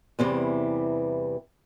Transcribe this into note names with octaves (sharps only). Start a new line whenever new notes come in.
E2 C3 E3 G3